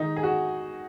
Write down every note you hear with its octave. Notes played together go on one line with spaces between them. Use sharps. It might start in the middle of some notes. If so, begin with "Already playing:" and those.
Already playing: D#3 G#3 D#4
G#4
F#4